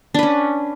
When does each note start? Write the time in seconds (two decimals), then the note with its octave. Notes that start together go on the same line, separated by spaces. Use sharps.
0.14 D4
0.19 B4
0.23 C#4